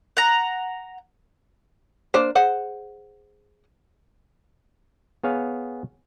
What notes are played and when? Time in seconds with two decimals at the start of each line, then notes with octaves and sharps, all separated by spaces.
0.17 F#5 A#5
2.14 A#3 D4 C5
2.35 G#4 C5 F#5
5.24 B3 G#4 C#5 F5